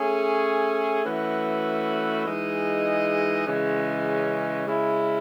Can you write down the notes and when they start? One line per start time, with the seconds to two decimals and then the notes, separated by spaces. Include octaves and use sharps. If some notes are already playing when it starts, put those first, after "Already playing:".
Already playing: A3 C#4 G#4 C#5
1.04 E3 A3 C#4 F#4 B4
2.25 E3 G#3 D#4 G#4 D#5
3.46 C#3 E3 G#3 C#4
4.67 C#3 G#3 C#4 E4